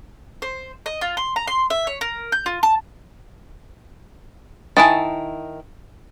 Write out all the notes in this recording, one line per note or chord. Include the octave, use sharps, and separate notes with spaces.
C5
D#5
F4
C6
A#5
C6
E5
C#5
A#4
G6
F4
A5
D#3 E4 G#5 A5 D#6 A6